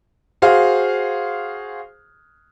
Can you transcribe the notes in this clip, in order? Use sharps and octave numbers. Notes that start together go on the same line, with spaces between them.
F#4 G#4 C5 F5